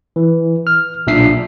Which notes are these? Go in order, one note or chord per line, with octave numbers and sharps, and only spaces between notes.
E3
F6
B1 A#2 D4 E5 B6 C7